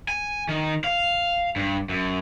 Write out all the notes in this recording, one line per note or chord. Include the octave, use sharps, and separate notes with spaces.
G#5
D#3
F5
G2
F#2